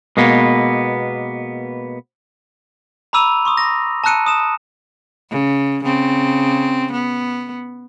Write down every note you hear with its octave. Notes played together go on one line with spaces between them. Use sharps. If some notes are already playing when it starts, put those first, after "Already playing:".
B2 G#3 A#3 B3
A#5 B5 D6 E6 D#7 F7
C6 C#6 D#6
A#6
A5 A#5 E6 F#6 C#7 D#7
D#6 E7
C#3
C#3 C4
B3